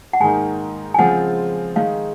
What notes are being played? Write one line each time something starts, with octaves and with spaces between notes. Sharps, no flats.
F#5
G#2 D#3 A#3 D#4 G#5
G#5
C#3 F3 G#3 C4 F4 F#5
D#3 G#3 D#4 F5